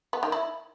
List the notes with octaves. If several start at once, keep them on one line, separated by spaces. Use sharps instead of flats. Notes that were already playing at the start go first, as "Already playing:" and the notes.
B3
D#3
E4